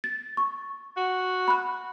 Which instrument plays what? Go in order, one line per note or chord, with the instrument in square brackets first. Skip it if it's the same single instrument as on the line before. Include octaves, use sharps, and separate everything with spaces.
[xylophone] A6
C#6
[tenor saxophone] F#4
[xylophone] B5 F#6